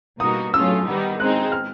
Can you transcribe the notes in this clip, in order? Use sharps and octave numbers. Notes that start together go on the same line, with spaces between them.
B2 G3 A#3 D#4 F#4 D#6
F#3 A3 C#4 F4 E6
D#3 G3 B3 D#4
G#3 C4 D#4 F#6
F6